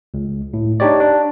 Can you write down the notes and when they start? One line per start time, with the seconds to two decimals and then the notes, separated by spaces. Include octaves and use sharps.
0.14 C#2
0.54 A2
0.80 D4 D#4 G4 C#5 D5
1.00 D4